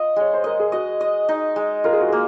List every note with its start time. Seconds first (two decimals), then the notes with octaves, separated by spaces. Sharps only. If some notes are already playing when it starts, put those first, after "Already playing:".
Already playing: F4 D#5
0.16 G#3 C#5
0.34 C5
0.44 A#4 D#5
0.60 G#4
0.72 F#4 D#5
1.01 D#5
1.29 D#4
1.56 G#3
1.84 F4 A#4
1.93 G#4
2.01 F#4
2.09 A#3 G#4